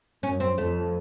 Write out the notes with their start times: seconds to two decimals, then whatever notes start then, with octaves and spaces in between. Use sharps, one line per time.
0.23 F#2 C#4
0.40 C4
0.58 F2 A3